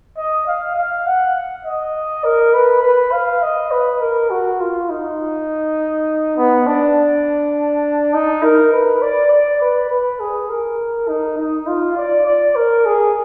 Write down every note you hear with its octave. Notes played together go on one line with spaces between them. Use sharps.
D#5
F5
F5
F#5
D#5
A#4
B4
B4
F5
D#5
B4
A#4
F#4
F4
D#4
B3
D4
D#4
A#4
B4
D5
D5
B4
B4
G#4
A#4
D#4
D#4
F4
D5
D5
A#4
G#4